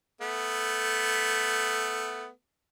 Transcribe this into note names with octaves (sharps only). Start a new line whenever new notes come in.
A3 B3